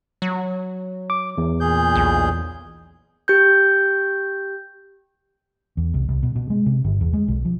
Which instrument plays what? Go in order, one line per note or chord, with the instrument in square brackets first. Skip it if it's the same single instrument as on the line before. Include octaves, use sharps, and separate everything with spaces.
[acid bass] F#3
[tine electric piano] D6
E2
[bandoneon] A#2 G#4 G6
[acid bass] B1
[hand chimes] G4 G6
[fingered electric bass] E2
C2
C2
B2
B2
G#3
C3
G1
E2
G#3
B1
F3